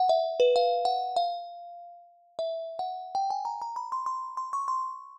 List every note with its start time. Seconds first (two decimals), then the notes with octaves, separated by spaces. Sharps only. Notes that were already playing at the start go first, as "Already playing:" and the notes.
Already playing: F#5
0.09 E5
0.40 B4
0.56 F5
0.85 F#5
1.16 F5
2.39 E5
2.79 F#5
3.15 G5
3.30 G#5
3.45 A#5
3.62 A#5
3.76 B5
3.92 C6
4.06 C6
4.37 C6
4.53 C#6
4.68 C6